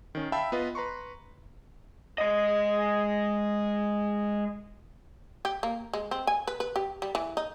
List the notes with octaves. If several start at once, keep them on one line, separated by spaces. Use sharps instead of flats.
D#3 C#4
E5 F5 G5 A5 B5 E6
B3 F4 B4 D#5
B4 A#5 C6 C#6
G#3 D#5
G4
A#3
G#3
C4
G#5
B4
B4
G4
G3
E3
D#4